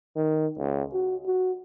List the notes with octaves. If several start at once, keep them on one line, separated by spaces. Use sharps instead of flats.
D#3
C#2
F#4
F#4